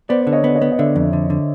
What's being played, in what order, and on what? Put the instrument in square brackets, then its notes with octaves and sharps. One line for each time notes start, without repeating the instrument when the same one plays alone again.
[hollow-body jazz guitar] B3 [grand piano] C5 D5
[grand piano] D5
[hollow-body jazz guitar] D3
[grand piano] C#5 D#5
[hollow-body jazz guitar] B3 [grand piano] D5
[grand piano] C#5 D#5
[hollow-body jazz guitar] B3
[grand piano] D#5
[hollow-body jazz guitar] D3 [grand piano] D5 E5
[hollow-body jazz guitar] F2
D3
D3